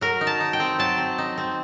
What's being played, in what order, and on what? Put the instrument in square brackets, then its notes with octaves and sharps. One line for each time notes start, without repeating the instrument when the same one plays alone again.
[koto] F#3 A#4
D#4
A5
D#4
G5
C4
F#3 A5
C4
D#4
C4